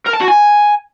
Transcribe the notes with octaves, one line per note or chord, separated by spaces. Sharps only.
A#4
A5
F#4
G#5